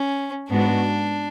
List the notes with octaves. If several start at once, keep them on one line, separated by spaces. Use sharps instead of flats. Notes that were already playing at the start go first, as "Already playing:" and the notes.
Already playing: C#4
G#2 G#3 B3 D4 F#4